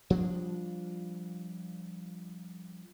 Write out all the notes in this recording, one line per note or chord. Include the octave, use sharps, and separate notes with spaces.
F3 G3 D4